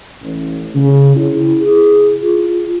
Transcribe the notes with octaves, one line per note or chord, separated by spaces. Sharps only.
A1
C#3
E4
G#4
F4